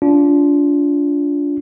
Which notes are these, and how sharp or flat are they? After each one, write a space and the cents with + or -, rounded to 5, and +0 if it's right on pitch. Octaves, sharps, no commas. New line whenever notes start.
D4 -30 F4 +0